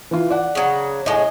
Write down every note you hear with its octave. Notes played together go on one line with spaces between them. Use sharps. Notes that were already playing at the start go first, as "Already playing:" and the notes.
E3 F4
D5 F#5
C#3 F#3
A2 G#3 D#5 G#5